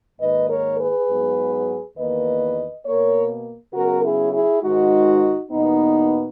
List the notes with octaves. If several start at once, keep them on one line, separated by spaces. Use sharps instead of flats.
G#2 D#3 A#3 B4 D#5
A#4 C#5
G#4 B4
G#2 F#3 B3
E2 D#3 A#3 B4 D#5
B2 A#3 A#4 C#5
C#3 F#3 B3 F#4 A#4
E4 G#4
E4 G#4
G#2 D#3 G#3 D#4 F#4
E2 B2 A#3 B3 D#4